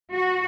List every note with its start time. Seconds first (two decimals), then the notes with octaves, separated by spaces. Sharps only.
0.13 F#4